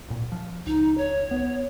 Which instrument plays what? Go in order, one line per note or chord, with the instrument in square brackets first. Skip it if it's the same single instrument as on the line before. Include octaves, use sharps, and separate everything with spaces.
[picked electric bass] D1 A#2
F3
[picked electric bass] C#2 [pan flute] D#4
[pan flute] C#5
[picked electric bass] B3